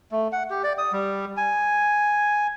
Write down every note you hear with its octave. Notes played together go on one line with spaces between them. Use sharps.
A3
F#5
G4
D5
D#6
G3
G#5